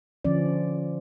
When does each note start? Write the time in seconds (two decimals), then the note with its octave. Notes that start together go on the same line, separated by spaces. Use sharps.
0.25 D3 F3 C#4 D5